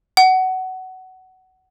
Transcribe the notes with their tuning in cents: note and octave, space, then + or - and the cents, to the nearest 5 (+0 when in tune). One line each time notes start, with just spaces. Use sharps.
F#5 +20